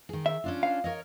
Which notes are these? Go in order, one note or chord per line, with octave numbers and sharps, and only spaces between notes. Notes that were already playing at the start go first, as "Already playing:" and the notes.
D#3 G#4
E5
C#4 D4 F4
F5
A#4 C#5 D#5